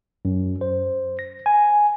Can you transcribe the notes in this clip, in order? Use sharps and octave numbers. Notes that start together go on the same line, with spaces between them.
F#2
C5
A#6
G#5